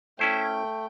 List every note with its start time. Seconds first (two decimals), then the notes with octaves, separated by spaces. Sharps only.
0.19 A3 C#4 E4 C5 G5